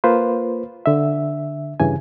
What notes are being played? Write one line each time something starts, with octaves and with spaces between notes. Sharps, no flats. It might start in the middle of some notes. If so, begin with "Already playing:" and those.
A#3 F4 B4 C5
D3 E5
G2 C#3 E3 G#5